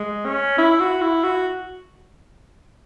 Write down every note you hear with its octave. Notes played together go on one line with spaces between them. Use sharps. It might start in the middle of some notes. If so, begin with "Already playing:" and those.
Already playing: G#3
C#4
E4
F#4
E4
F#4